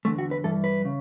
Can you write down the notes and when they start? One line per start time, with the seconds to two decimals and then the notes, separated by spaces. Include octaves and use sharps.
0.05 E2 D3 A3
0.18 F#4
0.31 B4
0.44 G2 E3 A4
0.64 B4
0.85 C#3